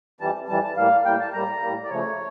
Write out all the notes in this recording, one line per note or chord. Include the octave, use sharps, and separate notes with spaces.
F2 E3 G3 A5
F2 E3 G3 A5
A5
A2 G3 A#3 F5
A2 G3 A#3 G5
A5
A2 G3 A#3 A#5
A2 G3 A#3
D5
C#3 F3 A3 C#5